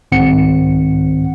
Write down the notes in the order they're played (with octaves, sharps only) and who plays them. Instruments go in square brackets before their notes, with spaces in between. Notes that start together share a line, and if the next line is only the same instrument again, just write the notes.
[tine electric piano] C2 G#2 D#3 C4 F#5 C#7